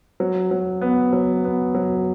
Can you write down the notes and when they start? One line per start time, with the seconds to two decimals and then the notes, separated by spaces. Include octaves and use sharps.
0.20 F#3
0.51 F#3
0.81 B3
1.13 F#3
1.44 B3
1.75 F#3